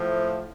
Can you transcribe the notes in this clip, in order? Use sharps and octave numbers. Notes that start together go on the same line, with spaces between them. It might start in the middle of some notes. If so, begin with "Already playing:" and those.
Already playing: A2 F3